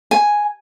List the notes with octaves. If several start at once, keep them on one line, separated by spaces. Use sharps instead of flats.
G#5